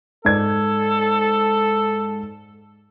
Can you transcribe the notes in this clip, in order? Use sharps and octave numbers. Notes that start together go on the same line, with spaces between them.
G#2 A4 D5 G#6